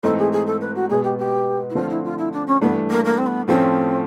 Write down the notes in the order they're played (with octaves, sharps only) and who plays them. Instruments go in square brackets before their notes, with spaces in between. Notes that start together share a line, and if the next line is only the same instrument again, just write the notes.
[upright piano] G#2 E3 A3 C4 D#4 [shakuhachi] A4
[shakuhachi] G#4
G#4
A4
B4
F#4
[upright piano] B2 G#3 B3 [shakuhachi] G#4
[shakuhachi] G4
G4
E4
[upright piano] D3 F3 A3 C4 [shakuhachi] F4
[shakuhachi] E4
F4
E4
D4
C#4
[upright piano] G2 E3 A3 D4 [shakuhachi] B3
[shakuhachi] A#3
A#3
C4
B3
[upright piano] A2 F3 A3 C#4 [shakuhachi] C4